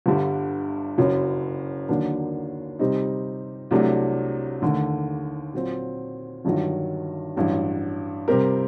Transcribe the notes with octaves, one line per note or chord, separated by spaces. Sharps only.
G1 G2 D3 G3
F#1 F#2 F#3
D#2 D3 F#3 A#3 D4
C3 G3 C4 D#4
C2 C3 F#3 A3 D4
D#2 D3 A3
A#2 F#3 C4
G1 G2 D#3 F#3
A1 G2 F#3
C3 G3 C4 G4 A#4